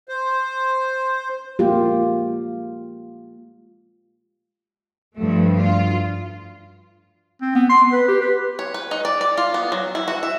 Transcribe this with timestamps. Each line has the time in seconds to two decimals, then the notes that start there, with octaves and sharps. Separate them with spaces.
0.09 C5
1.59 G#3 A#3 F4 G4
5.16 G2 F3 A3
5.60 F4
7.41 C4
7.55 B3
7.69 C6
7.92 B4
8.08 G4
8.21 B4
8.59 C#5
8.74 B4
8.91 D#4
9.05 D5
9.21 D5
9.38 F4
9.54 B3
9.72 F#3
9.95 E4
10.08 F#4
10.23 E5